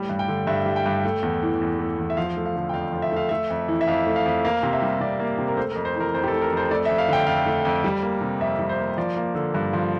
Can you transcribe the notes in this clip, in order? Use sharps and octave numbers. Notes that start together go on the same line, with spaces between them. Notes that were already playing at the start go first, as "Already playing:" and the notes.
Already playing: A2 G3
G2
G5
D3
G2 E5
G3
G5
G2
A3
E2
E3
E2
A3
E2
E5
F3 F5
A3
F5
D3
G5
F2 F5
F3
E5
A3 F5
A3 E5
F2
E3
E5
F2 F5
A3
F5
F2
A#3 F5
C3
E5
G3
C3 D5
A#3
C3
A#4
A3 C5
A#4
F2
C5
E3 A#4
F2 C5
G4
A4
A3
A#4
F2
C5
A3 D5
E5
F2
F5
D3 G5
F2 F5
A3
F2
G3
A#3
C3
F2 E5
G3
C5
A#3
F3 D5
A#3
D3
G2
F3